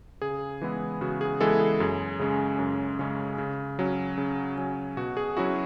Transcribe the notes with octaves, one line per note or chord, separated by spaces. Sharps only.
C#3 G#4
E3 G#3 B3 E4
C#3 F#4
G#4
E3 G#3 B3 E4 A4
G#4
F#2 G#4
C#3 G#3 C#4
F#2
C#3 G#3 C#4
C#3
F#3 C#4
C#3
F#3 C#4
B2 F#4
G#4
F#3 C#4 E4 F#4